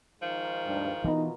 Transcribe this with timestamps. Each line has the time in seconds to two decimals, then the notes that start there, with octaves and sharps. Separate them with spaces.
0.21 G#2 D#3 F3
0.66 D2 G2
1.04 B2 E3 B3 D#4 F4 A#4